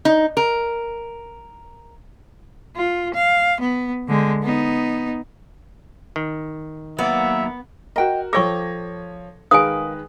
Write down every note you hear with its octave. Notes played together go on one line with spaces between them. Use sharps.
D#4
A#4
F4
F5
B3
D3 G#3
B3 D#4
D#3
F#3 A#3 B3 D5 E5
F#4 A#4 D#5 G5
F3 A4 C#5 G5 C#6 D6 A#6
D#3 G#3 A#4 B4 F5 G#5 D#6